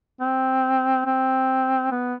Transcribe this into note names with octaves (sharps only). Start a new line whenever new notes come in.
C4
C4
B3